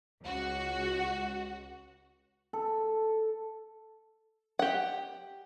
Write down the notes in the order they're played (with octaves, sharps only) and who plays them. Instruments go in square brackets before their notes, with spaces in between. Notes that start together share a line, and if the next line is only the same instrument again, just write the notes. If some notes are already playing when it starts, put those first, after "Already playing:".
[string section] C#2 F#4
[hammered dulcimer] A4
[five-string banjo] G4 F#5